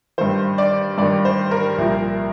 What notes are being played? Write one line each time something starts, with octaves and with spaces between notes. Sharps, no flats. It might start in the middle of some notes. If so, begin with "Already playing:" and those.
G2 D#3 C5
D5
G2 D#3 D5
C5
A#4
C2 A#2 F3